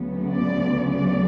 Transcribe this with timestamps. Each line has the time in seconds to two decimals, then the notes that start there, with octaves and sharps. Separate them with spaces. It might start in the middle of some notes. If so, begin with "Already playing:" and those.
Already playing: D2 C#3 F#3 B3
0.30 D5
0.90 D5